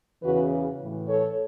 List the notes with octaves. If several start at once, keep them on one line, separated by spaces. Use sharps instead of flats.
E2 C#3 E3 F#4 B4
A2 E3
A4 C#5